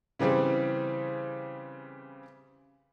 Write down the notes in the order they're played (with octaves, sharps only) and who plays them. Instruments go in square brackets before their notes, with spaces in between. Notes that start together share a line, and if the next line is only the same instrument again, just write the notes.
[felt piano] C#3 E3 G3 C4 G#4